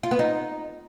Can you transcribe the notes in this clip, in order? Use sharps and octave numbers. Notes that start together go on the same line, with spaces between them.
F4
B3
D#4